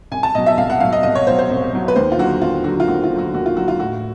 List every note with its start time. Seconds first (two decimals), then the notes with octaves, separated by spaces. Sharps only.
0.12 C2 G#5
0.23 A5
0.35 B2 F#3 D#5
0.46 E5
0.57 C2 F5
0.70 F#5
0.80 B2 F#3 F5
0.92 D#5
1.03 C2 D#5
1.15 C#5
1.27 B2 C5
1.31 F#3
1.39 C5
1.50 C2
1.73 B2 F#3
1.88 B4
1.96 D#2 C5
2.12 F4
2.18 D3 F#3 F#4
2.42 D#2 F4
2.64 D3 F#3 F#4
2.80 F4
2.88 D#2 F#4
3.04 F4
3.11 D3
3.16 F#3 F#4
3.33 D#2 F#4
3.46 F4
3.57 D3 F#3 F#4
3.68 F4
3.80 A2 F#4